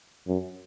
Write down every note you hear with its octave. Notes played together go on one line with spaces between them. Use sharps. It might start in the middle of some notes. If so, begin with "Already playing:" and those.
F#2